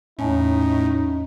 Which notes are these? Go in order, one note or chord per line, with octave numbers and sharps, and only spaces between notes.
E2 A2 C#4 D#4 G#5 A5